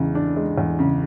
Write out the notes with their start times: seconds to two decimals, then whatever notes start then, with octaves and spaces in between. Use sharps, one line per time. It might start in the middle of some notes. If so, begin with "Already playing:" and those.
Already playing: E2 C#3 G#3 D4
0.15 D4
0.37 G#3
0.58 E2
0.79 C#3